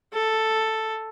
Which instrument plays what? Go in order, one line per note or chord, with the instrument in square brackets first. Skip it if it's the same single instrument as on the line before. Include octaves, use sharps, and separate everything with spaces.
[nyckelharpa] A4